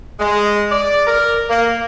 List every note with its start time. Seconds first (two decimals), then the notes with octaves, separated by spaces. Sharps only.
0.20 G#3
0.71 D5
1.06 A#4
1.50 A#3